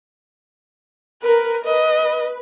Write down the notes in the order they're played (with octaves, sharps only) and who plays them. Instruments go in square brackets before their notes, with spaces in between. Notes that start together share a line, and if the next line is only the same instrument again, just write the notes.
[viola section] A#4 [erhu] B4
[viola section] B4 [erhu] D#5